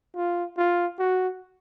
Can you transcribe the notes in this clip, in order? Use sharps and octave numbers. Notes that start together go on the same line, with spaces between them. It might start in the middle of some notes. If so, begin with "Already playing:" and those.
F4
F4
F#4